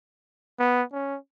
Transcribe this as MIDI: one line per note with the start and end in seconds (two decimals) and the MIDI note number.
0.60 0.83 59
0.93 1.18 61